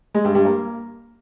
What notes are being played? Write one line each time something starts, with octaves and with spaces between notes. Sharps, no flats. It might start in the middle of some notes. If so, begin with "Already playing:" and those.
G#3
G2
G2
A#3